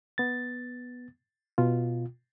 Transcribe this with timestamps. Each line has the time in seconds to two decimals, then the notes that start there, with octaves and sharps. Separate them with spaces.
0.18 B3 A6
1.58 B2 F4